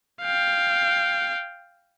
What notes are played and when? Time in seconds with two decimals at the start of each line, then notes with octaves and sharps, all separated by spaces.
0.22 F5 G5